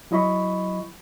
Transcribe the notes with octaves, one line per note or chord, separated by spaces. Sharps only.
F#3 E4 D#5 B5 C#6